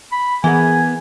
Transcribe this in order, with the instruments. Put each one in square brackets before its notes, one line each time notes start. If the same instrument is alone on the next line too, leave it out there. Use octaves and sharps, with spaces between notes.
[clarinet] B5
[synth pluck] E3 [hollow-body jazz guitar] B3 A#4 F#5 [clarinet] G#4 [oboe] G#5